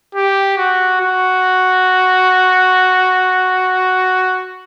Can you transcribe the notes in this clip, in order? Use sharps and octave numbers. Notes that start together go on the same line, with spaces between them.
G4
F#4
F#4